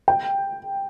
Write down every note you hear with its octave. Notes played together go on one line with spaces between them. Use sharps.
G5